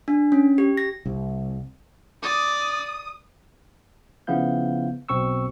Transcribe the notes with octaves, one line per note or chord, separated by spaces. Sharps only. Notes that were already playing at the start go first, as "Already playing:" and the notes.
D4
C#4
G4
A#6
C2
D5 D#6
C#3 F3 B3 E4 F5 G6
B1 B2 C4 C#6 E6